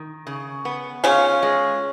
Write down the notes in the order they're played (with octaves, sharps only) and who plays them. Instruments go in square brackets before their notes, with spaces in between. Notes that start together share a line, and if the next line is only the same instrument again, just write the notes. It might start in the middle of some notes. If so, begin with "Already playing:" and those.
Already playing: [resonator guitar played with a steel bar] D#3
C#3
B3
[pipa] C#3 C#4 [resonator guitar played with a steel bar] F4
[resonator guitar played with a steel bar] G#3